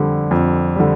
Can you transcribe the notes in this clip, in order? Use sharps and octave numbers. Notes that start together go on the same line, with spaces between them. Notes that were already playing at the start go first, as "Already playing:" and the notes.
Already playing: F2 D3 G3
F2
D3 G3